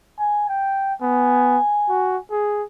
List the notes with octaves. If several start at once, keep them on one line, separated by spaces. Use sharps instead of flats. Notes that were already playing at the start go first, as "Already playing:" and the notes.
G#5
G5
B3 G#5
F#4
G#4